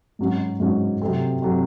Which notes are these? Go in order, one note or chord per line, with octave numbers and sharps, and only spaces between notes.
G#2 F#3 C#4 F#4
G#2 F#3 C#4 F#4
C3 F#3 A3 C4
C3 F#3 A3 C4